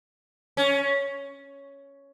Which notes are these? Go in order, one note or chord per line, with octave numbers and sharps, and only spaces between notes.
C#4